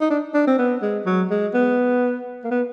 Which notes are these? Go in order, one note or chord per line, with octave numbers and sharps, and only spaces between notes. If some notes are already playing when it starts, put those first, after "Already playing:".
D#4
D4
D4
C4
B3
G#3
F#3
G#3
B3
A#3
B3